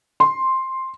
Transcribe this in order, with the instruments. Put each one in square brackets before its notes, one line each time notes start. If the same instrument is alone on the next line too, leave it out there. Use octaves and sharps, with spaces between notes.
[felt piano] C6